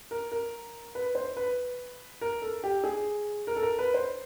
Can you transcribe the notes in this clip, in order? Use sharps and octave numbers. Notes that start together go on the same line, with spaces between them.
A#4
A#4
B4
C5
B4
A#4
A4
G4
G#4
A#4
A4
A#4
B4
C5